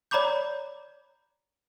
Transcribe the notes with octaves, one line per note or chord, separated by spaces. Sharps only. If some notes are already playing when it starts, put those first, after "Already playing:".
C#5 D5 A#5 B5 D6 G6